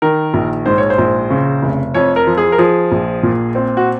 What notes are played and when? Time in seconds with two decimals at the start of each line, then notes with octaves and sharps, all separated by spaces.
0.02 D#3 A#4
0.34 A#1
0.66 G#2 C5
0.78 C#5
0.90 C5
0.98 A#1
1.30 C#3
1.63 F1
1.94 F2 C#5
2.16 A#4
2.27 F3
2.37 G#4
2.52 A#4
2.58 F3 G#4
2.92 A#1
3.23 A#2
3.55 C4
3.77 F#4